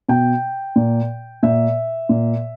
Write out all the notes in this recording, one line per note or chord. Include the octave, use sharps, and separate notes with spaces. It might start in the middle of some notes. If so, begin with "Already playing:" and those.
B2 G5
A#2
A#2 E5
A#2